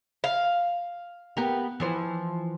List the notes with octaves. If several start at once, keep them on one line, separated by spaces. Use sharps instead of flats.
F5
B3 G4 A#4
E3 F3 C5